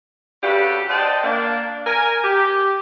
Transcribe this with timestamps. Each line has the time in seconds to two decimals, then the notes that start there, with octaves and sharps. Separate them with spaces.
0.43 C#3 D4 F#4 G4 A4 B4
0.89 C5 D5 D#5 F#5 G5 A5
1.24 A#3 D4
1.86 A#4 G#5
2.24 G4